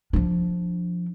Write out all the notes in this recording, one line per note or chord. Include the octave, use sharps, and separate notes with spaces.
F3 D4